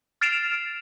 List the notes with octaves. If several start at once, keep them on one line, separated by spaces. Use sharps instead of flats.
F6 A6 C7 D7 E7 F7